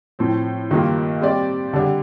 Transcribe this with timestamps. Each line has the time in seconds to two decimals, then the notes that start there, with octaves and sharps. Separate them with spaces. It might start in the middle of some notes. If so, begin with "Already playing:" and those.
0.19 A2 F3 C4
0.71 G2 D#3 G3 A#3 F4
1.21 G3 C4 G4 D5
1.73 D3 G3 D4 G4